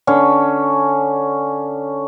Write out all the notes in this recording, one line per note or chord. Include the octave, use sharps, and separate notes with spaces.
D3 C#4